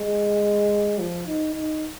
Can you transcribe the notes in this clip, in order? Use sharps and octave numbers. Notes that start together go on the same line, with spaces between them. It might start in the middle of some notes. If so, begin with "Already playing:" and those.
Already playing: G#3
F3
D#4
D#4